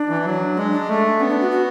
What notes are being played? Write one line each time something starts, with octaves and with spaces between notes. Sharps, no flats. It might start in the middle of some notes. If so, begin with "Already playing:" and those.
Already playing: D4
E3
F#3
G#3 D4
D4
A3
B3 C#4
D4
F#4
F#4